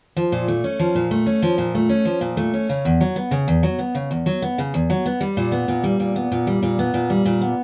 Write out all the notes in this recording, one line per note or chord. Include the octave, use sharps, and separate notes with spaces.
F3
A#2
A3
C#4
F3
A#2
A3
C#4
F3
A#2
A3
C#4
F3
A#2
A3
C#4
C#3
E2
F#3
B3
C#3
E2
F#3
B3
C#3
E2
F#3
B3
C#3
E2
F#3
B3
G3
A#2
B3
A#2
G3
A#2
B3
A#2
G3
A#2
B3
A#2
G3
A#2
B3